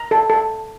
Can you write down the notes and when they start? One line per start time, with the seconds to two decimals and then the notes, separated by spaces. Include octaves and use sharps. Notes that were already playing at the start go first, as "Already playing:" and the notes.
Already playing: A#5
0.11 A4
0.30 A4